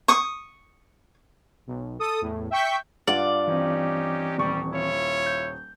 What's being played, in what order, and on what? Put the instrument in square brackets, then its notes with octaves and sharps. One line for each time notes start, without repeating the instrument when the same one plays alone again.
[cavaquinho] C#6 D#6
[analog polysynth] B1
A4 D#6
E2 A2
E5 G5 C#6 G6 B6
[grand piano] G2 F4 F#5 [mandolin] D5
[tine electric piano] E3 C4 [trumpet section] C#4 D#4 G4
[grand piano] D#1 C#6 [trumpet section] G3
[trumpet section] E4 F4 C#5
[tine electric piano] G6